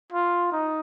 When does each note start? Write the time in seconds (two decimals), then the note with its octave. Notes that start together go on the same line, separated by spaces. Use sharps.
0.13 F4
0.52 D#4